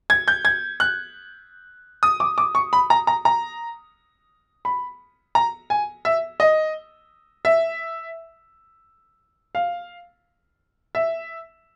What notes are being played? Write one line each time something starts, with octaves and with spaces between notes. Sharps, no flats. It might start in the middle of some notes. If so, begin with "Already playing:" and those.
G#6
G6
G#6
F#6
D#6
D6
D6
C#6
B5
A#5
A#5
A#5
B5
A#5
G#5
E5
D#5
E5
F5
E5